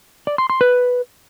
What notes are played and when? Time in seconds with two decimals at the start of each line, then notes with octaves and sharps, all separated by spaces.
0.27 D5
0.38 C6
0.50 C6
0.61 B4